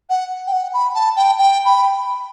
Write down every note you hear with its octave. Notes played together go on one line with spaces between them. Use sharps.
F#5
G5
F#5
B5
A5
G5
G5
B5